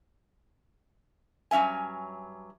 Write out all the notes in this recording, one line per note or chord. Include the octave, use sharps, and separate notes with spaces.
G2 F#3 C#4 E5 G#5